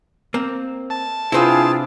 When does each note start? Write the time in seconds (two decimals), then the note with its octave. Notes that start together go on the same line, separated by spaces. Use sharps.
0.34 A#3 C4
0.90 A5
1.32 C3 D4 E4 F4 G#4 B4 C5 G5